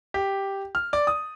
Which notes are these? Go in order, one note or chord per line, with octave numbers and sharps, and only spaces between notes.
G4
F6
D5
D#6